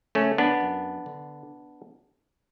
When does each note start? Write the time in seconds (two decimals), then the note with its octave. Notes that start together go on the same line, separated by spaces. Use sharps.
0.15 C#3 A3 C#4
0.38 B3 D4
0.61 F#2
1.06 D3